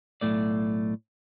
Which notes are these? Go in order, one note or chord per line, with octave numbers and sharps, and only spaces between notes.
B1 F#2 A2 A3 D5